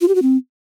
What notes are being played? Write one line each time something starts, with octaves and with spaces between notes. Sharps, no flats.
F4
G4
F#4
C4